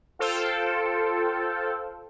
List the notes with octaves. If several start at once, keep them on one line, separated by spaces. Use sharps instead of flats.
F4 A4 C5 F5 G5